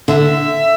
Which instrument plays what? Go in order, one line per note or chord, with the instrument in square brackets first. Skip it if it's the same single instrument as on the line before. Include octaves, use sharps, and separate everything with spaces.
[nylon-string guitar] D3 [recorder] E5